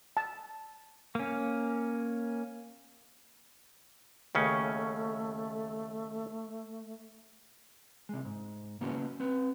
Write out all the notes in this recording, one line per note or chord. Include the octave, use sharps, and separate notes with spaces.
A5
A#3 C#4
D#2 C#3 A3 C#4
C3 G#3
G#2
C#3 A#3 B3 C#4 F#4
C4 B4